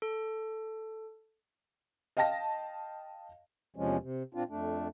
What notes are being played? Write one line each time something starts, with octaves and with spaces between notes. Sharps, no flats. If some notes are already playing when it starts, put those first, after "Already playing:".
A4
D#5 F5 G5 A5 A#6
E2 C3 F3 G#3 C#4
C3
A#2 C4 D4 F4
F2 A3 D4